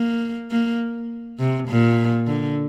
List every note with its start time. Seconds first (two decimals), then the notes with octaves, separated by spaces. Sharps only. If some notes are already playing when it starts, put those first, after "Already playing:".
Already playing: A#3
0.51 A#3
1.39 C3
1.68 A#2
2.27 D3